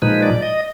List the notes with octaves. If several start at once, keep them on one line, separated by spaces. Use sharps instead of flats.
A#2 F3 G#3 D#4 B4
D5
D#5